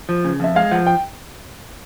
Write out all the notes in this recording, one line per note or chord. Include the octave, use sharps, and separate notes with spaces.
F3
C#3
F2 E5
G#3 F5
F3 F#5
G5